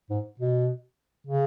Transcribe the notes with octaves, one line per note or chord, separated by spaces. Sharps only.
G#2
B2
C#3